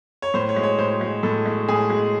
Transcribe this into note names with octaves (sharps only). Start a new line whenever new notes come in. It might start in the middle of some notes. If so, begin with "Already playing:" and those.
C#5
A2 C5
C#5
G#3
C#5
A2 C5
G#3
A2 A4
G#3
A2 G#4
G#3